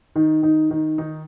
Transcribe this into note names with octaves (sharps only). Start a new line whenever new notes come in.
D#3 D#4
D#3 D#4
D#3 D#4
D#3 D#4